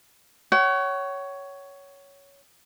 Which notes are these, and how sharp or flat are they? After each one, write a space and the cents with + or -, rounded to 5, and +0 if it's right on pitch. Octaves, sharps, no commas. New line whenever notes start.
C#5 +10 F#5 +40